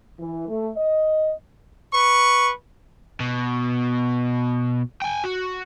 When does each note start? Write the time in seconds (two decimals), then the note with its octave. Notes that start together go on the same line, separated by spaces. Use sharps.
0.19 E3
0.48 A3
0.77 D#5
1.92 B4 C#6
3.20 B2
5.02 G5 G#5
5.24 F#4